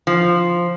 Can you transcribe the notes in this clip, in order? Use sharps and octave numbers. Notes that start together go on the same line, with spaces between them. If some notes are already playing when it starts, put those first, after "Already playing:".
F3